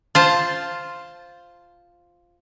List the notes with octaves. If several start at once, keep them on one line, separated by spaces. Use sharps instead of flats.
F4 C5 A5